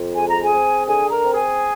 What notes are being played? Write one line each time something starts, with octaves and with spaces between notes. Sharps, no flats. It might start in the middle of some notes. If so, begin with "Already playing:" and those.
Already playing: F2
G#3 G#5
A#5
G#4 G#5
C4
D3 G#4 G#5
A#4 A#5
C4
G#4 G#5